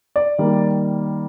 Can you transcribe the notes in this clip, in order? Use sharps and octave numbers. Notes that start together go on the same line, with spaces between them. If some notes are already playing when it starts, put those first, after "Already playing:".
D5
D#3 G3 A#3